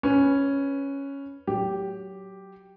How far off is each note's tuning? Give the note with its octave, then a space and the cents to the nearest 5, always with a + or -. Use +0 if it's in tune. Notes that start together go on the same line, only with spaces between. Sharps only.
C#4 +0 B4 -5
F#3 +15 G4 +0